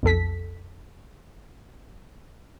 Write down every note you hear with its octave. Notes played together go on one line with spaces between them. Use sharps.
B1 F2 A4 B6